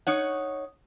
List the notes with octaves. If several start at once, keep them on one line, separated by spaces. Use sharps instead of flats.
D#4 C#5 F#5